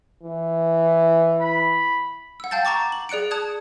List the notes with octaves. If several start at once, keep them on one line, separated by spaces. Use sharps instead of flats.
E3
B5
F#5 E6
F5 G5 A5 G6 A6
A5 A#5 C#6 D6 A6
F#7
G#4 D5 F#6 C#7 D7
A5 D#6 F#6 G#6